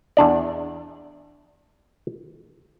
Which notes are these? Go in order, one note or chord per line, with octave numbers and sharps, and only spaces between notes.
E2 D4 D5